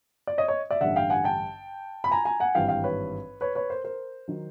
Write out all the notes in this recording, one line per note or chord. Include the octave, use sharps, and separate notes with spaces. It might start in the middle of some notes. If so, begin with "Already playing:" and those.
D5
C#5 D#5
C#5 D#5
D5 E5
A1 G2 D3 E5 F#5
F5 G5
F#5 G#5
G5 A5
B5
G#5 A#5
G#5 A#5
F#5 G#5
G#1 G2 E3 F5 G5
F5 G5
B4 C#5
B4 C#5
B4 C#5
A#4 C5
A#4 C5
D#3 F#3